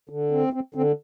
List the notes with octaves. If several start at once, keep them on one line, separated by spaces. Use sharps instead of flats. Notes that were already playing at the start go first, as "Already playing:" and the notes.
D3
C4
C4
D3 C4